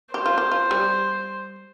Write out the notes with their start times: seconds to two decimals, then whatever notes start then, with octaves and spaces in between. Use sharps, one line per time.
0.14 G4 C5
0.26 F4
0.38 G4
0.52 F4
0.71 G3